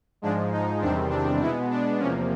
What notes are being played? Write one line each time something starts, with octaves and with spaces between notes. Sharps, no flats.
G#2 F3 G#3 D4
D#4
E2 C3 D#3 G3 C4 D4
D4
B2 G#3 B3 E4
D4
E2 C3 F3 A#3 C#4